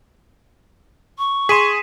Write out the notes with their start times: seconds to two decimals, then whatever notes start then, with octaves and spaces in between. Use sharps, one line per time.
1.18 C#6
1.49 G#4 C6 B6 D#7 E7